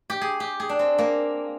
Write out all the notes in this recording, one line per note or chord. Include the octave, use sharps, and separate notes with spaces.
G4
G#4
G4
G#4
D4
C4
A#3